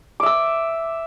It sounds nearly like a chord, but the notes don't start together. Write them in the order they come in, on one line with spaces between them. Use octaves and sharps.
D6 E5 E6